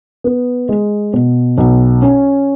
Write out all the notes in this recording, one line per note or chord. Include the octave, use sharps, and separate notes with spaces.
B3
G#3
B2
B1
C#4